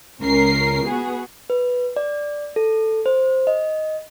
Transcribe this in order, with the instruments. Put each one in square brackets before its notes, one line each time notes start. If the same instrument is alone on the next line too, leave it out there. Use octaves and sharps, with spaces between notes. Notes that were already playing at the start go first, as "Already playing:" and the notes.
[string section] C#2 C#4 A#4 C7
B3 F#4 G#4
[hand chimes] B4
D5
A4
C5
D#5